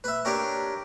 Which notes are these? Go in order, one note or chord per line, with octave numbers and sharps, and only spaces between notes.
B4 E5
D4 G4 A#4 C#5